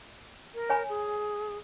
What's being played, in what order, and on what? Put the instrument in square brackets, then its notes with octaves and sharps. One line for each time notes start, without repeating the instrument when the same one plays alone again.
[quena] A#4
[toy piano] C#5 G#5 B5
[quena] G#4